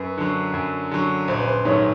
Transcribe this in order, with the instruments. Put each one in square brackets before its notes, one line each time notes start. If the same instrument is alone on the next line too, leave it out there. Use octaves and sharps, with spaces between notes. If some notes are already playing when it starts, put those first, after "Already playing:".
Already playing: [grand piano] F#2 [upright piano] B4
[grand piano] D3 F#3
F#2
D3 F#3
[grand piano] A#1 [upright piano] C5
[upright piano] B4
C5
[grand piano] G#2 D#3 F#3 A3 [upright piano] C#5